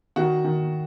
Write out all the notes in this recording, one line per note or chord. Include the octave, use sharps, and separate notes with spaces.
D#3 F#4
D#3